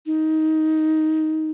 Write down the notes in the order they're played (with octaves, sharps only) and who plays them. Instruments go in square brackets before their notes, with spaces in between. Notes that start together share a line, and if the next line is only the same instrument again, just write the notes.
[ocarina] D#4